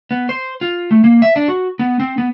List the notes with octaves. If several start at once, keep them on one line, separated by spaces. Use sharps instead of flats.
B3
C5
F4
A3
A#3
E5
D4
F#4
B3
C4
B3